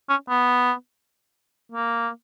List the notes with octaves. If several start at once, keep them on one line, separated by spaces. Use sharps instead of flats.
C#4
B3
A#3